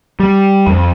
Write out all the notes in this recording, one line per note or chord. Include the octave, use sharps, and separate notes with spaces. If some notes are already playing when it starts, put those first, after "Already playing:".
G3
F2